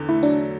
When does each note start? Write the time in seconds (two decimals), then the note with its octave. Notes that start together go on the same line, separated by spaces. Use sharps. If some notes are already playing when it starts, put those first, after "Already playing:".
Already playing: E2 D3
0.09 A3 E4
0.23 F#3 D4